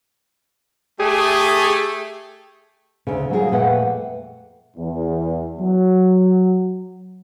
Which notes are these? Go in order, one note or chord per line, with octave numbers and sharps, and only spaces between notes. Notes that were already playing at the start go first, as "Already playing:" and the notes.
A3 G4 G#4
D2 C#3
F#3 G3 A#3 B3 F4 G#4
F2 A#2 A3 B4 F#5 G5
E2
F#3